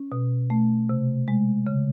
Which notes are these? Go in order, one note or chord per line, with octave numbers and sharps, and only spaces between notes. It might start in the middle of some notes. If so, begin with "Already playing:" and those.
Already playing: C#4
B2
A3
C3
G#3
C#3